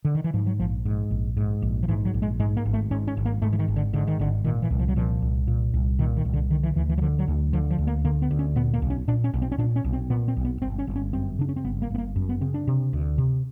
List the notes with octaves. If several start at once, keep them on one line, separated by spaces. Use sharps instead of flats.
D3
D#3
E3
G#2 F3
F#3
A#1 F3
G#2
A#1
G#2
A#1
F3
G#2 E3
F#3
A#1
G#3
G#2 G#3
A#3
G#1
A3
G#2 C#4
C#4
G#1
A#3
G#2 A3
E3
D#3
G#1
D3
G#2 D3
D#3
G#1 D3
A#2 D#3
E3
C2
F3
F#3
A#2 F3
C2
A#2
C2
A#2 D#3
D#3
C2
D3
D3 D#3
E3
D2 E3
E3
F#3
D3 F3
F#3
D2
D3 F3
F3
D2
A#3
D3 A#3
B3
D2
C#4
A#2 B3
A#3
B1
C#4
A#2 D4
C#4
B1
C4
C#4
A#2 D4
C#4
B1
C4
A#2 B3
C4
B1
B3
G1 C4
C#4
G1
C#4
F#2 C4
C#3 D4
C#4
C4
G1 B3
A#3
G1 B3
A#3
F#2
B3
C#3 C4
D4
C3
D2
C3